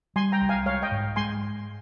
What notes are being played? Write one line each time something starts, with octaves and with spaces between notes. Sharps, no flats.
G3 G#5 C6
G5 A#5
C2
F5 G#5
G#3 C#5 F5
D#5 G5
G#2
G#3 G#5 C6